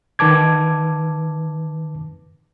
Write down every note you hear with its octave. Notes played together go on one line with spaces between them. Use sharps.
D#3 B4 A5 D6 G#6